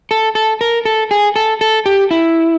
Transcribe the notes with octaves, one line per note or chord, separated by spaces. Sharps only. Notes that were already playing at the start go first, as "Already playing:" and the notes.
A4
A4
A#4
A4
G#4
A4
A4
G4
E4